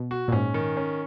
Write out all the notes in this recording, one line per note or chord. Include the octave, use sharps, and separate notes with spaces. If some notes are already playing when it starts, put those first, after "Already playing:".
Already playing: B2
F#4
A#2
G#2 C#4
D#3
C#4